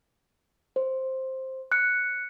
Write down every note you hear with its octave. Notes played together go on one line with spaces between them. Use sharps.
C5
F#6 C#7